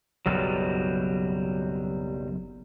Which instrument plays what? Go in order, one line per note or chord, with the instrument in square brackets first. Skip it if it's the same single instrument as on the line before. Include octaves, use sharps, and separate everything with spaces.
[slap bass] F#1 B1 F#2 [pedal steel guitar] F#3 G3